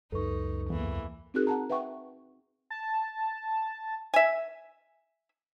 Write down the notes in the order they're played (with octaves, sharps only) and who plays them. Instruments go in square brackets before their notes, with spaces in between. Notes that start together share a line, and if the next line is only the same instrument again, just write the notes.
[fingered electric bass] C#2 F#2 [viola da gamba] D#4 [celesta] A4 B4 C#6
[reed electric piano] E2 [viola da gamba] E3 A#3
[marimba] C4 D#4 F#4 G#4 A#4 F#6
F#5 A5 A#5
B4 E5 F#5 G5 C#6
[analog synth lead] A5
[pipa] E5 G#5